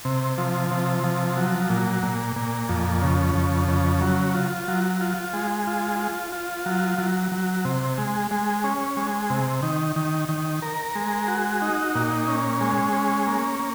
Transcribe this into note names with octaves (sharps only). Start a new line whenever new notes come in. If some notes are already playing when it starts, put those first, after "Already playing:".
C3
F3
C3
F3
F#3
A#2
A#2
A#2
F2
C#3
F2
C#3
F#3
F4
F#3
F4
G#3
F4
F4
F4
F#3
F#3
F#3
C3
G#3
G#3
C#4
G#3
C3
D#3
D#3
D#3
A#4
G#3
F#4
D#4
A#2
C#4
G#3
C#4
A#3
A#3